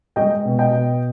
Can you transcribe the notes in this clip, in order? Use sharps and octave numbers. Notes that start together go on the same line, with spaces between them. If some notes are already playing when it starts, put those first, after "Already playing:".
G#3 D#5 G5
B2
D#5 G5
B2